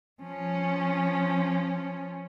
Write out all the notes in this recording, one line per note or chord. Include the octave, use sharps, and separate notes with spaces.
F3 C#4